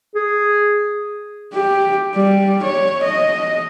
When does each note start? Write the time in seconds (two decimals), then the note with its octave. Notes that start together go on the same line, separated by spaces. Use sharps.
0.15 G#4
1.53 G4
2.15 G3
2.63 C#5
3.03 D#5